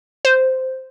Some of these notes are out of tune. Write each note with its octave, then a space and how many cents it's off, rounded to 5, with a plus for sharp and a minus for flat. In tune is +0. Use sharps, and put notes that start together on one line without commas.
C5 -5